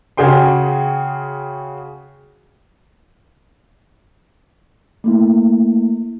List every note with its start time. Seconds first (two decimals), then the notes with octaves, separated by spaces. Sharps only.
0.17 C#3 F#4 G#4 G5 C6
5.04 A3 A#3 E4